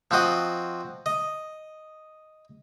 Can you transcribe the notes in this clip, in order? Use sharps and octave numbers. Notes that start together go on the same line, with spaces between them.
F3 C4 F#4 D#5
D#5